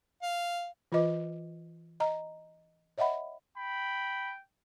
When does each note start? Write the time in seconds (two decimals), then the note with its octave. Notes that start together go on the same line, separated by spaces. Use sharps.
0.22 F5
0.92 E3 F4 B4 D#5 D6
2.00 D#5 A#5
2.98 C#5 D#5 E5 F#5 B5
3.58 G5 B5